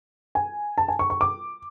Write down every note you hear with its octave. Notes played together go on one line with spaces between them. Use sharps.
G#5
A5
G#5
C#6
C#6
D6